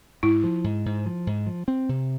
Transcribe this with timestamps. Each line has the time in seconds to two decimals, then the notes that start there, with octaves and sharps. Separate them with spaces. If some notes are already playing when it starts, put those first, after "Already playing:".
0.23 G#2 E4
0.44 F3
0.64 G#2
0.86 G#2
1.06 F3
1.27 G#2
1.47 F3
1.68 C4
1.89 C3